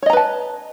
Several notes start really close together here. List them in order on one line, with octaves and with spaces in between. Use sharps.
C#5 D#5 A#5 B4 A5